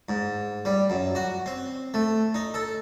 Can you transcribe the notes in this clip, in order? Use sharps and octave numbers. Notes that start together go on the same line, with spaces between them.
G#2
G3
F#2
F#4
C4
A3
D#4
A4